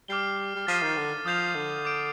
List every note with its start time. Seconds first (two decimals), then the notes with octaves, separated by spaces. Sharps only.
0.08 G3 D6 F6 C7 G7
0.56 G3
0.67 F3 A6 C7 D#7
0.82 D#3
0.97 D3
1.26 F3 D#6 G6 C7 F7
1.55 D3
1.85 D6 G6 D7